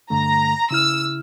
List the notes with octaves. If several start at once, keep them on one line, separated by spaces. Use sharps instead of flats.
G2 D3 A3 A#5
C#3 E4 E6 F6